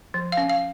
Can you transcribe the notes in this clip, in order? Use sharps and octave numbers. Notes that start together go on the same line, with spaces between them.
F3
F5
C#4
F5